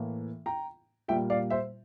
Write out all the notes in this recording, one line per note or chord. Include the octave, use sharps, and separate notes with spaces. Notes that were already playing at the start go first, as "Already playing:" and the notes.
Already playing: A2 E3 A#3
G5 A#5
A#2 G3 A#3 E5 G5
D5 F5
C5 E5